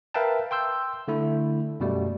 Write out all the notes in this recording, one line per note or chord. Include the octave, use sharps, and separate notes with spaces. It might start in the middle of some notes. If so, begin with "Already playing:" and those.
A#4 B4 E5 F5 G5 A5
G5 C6 E6 G6
D3 A3 E4
F#2 B2 G3 A3